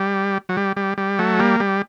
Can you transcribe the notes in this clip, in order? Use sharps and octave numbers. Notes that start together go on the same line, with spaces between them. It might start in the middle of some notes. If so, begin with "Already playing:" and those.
Already playing: G3
F#3
G3
G3
G3
F#3 A3
G3 A#3
G3